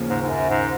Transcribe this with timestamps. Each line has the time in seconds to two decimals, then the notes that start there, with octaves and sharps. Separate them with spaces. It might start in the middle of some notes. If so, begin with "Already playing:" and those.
Already playing: D#2 C#3 F3 A#3 C#4
0.10 G#2
0.22 G#2
0.29 F#2
0.50 G#2